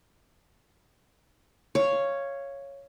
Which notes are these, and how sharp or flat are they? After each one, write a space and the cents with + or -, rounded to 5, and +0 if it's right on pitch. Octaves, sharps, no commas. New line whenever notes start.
C#5 +0 F5 -15